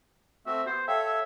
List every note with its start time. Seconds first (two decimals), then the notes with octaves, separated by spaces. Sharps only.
0.46 A3 C4 F#4 E5
0.67 B3 G4 C5
0.88 A4 C#5 E5 F5 G5
1.06 E5